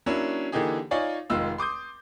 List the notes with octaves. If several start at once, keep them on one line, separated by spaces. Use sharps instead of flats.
F#3 A#3 C#4 D4 E4
D3 E3 A#3 D#4 G4 G#4
D#4 F4 C#5 D5 F5 G#5
F1 D#3 G#3 F4 E6
C6 D6 D#6 G6